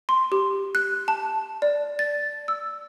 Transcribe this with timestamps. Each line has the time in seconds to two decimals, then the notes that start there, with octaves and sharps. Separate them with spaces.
0.09 C6
0.32 G4
0.75 F#6
1.08 A5
1.62 D5
1.99 A6
2.48 E6